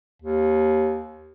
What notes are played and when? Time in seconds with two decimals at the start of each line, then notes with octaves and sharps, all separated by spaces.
0.22 D#2